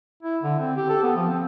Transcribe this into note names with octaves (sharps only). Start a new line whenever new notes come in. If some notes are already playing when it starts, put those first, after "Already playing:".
E4
D3
C4
G4
A4
B3
F3
C4